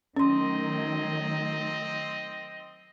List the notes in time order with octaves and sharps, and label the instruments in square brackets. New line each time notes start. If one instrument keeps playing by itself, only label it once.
[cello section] D#3 F#3 A3 [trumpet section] C4 D#5 [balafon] C#4 C6